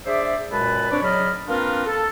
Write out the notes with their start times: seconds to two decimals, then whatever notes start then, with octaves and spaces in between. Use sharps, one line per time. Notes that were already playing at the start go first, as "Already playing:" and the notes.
0.06 D4 G#4 C5 D5 E5
0.50 F#2 A#2 G#3 B4 A5 B5
0.91 C4 D4 B4 C#5 D5
1.03 C#3 F#3 D5 D#5 B5 F6
1.48 A#3 C4 D4 F4 A#4 B4
1.86 A4